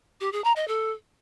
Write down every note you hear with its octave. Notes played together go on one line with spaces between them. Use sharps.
G4
G#4
A#5
D#5
A4